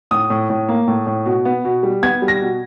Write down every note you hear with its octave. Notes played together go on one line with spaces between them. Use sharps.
A2 D#6
A2
A2
A#3
A2
A2
B2
B3
B2
G3
B3 G#6
G3
A#6
B2